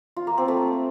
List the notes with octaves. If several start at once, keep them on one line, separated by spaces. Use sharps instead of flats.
F4
A#3
C4
A3